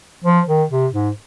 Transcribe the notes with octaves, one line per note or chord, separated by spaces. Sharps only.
F3
D#3
C3
G#2